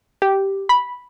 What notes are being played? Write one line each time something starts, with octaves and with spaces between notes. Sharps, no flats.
G4
B5